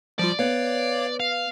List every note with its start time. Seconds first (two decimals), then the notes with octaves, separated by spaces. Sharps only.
0.19 F3 G3 F4 D5
0.39 B3 C#5 F5
1.20 F5